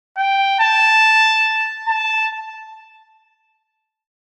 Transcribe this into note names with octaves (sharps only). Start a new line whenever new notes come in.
G5
A5
A5